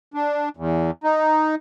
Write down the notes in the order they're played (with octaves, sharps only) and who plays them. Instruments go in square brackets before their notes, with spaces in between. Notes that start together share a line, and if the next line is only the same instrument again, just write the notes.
[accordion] D4
E2
D#4